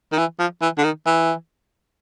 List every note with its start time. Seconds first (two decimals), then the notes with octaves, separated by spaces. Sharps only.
0.12 D#3
0.18 E3
0.39 F3
0.62 E3
0.78 D3
0.84 D#3
1.06 E3